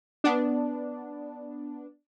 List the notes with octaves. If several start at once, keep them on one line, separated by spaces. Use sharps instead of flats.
B3 D4